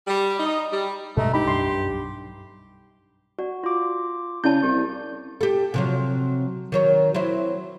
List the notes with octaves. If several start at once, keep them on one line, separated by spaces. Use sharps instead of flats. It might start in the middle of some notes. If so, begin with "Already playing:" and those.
G3
D#4
G3
G2 B2 G#3 A3 A4 D#5 A#5
D#4 G4 B5
B1 F#2 D4 C6
F#4 D5
F4 D6
C#3 E4 D5 A5 G6
C2 G4 C#6
G4 A4
C3 F3 F#3
D#3 F#3 C#5
F#3 C4 E4